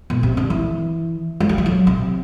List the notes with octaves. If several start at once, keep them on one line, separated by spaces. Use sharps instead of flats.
B2
C3
D3
E3
G3
F#3
E3
F#3
C3